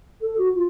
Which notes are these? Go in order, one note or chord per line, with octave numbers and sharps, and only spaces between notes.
A4
F#4
F4